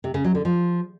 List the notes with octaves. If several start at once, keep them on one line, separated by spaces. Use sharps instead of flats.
C3
C#3
F#3
D3
F3